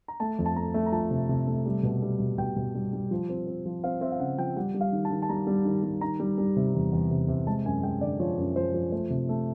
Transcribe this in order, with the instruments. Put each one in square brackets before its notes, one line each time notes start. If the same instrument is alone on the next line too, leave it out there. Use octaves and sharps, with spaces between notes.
[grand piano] A#5
A3 A5
F2
A5
A3 A#5
A3
A#5
F3 A5
C3
C3
A3
G3
B2
G3
B2
B2 G5
B2
G3
G3
F3
C4
C4
F3
C4 F5
C4 E5
F5
C#3 F#5
F3 G5
G3 F#5
G3
F5
D#3
A5
D#3
A5
G3 A#5
G3
D#3
G3
D#3 A#5
G3
G3
C3
E2
E2
C3
C3
G#3 A5
F#2 G#5
G#3 G5
D3 D5
F3 C#5
F#2
F3 C5
F3
A3 C5
C3
A3